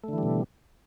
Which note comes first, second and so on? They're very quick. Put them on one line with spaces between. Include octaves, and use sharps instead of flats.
A3 D3 E3 G3 B2